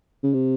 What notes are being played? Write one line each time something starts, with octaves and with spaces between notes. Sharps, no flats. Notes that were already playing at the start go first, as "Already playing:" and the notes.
C#3
C3